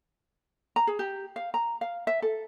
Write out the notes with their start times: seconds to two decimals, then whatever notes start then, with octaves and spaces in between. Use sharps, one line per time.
0.76 A#5
0.87 G#4
0.99 G4
1.36 F5
1.54 A#5
1.81 F5
2.07 E5
2.22 A4